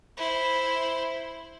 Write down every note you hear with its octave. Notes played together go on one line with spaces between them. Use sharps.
E4 C5